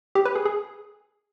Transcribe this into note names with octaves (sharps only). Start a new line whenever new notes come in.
G4
B4
G#4
G#4